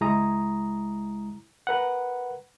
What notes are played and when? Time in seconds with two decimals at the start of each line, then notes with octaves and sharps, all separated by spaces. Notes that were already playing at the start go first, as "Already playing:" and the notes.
0.01 C#2 G#3 E4 A#5 D#6
1.67 A#4 B4 F#5